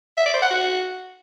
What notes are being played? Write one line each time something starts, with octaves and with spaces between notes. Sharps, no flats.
E5
D5
C5
F#5
F#4